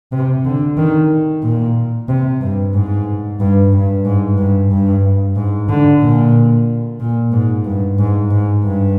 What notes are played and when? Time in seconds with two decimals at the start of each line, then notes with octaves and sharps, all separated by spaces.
0.12 C3
0.45 D3
0.78 D#3
1.43 A#2
2.09 C3
2.41 G2
2.74 G#2
3.40 G2
3.73 G2
4.05 G#2
4.38 G2
4.71 G2
5.36 G#2
5.69 D3
6.02 A#2
7.00 A#2
7.32 G#2
7.65 G2
7.98 G#2
8.31 G#2
8.63 G2